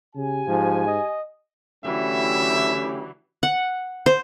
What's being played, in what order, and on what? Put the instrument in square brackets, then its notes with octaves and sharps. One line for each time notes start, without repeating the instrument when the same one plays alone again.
[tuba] C#3 [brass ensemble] G4 G#5
[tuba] G#2 [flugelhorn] F3
[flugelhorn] D#5
[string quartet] D3 E3 F#3 [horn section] A3 C#4 E4 [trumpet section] G4 [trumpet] E5
[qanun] F#5
C5